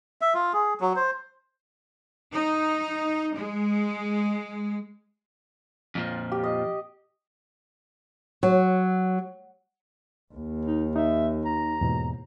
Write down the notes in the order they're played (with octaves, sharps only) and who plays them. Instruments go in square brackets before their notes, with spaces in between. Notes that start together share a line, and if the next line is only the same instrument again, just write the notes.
[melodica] E5
F4
G#4
F#3
C5
[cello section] D#4
G#3
[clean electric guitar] F2 A#2 F3
[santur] G4
D#5
[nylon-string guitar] F#3
[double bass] D#2
[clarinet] D#4
[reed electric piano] D#4 [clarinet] E5
[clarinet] A#5
[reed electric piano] E2 G#2 B2